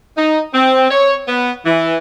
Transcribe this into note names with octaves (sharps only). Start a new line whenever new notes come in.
D#4
C4
C#5
B3
E3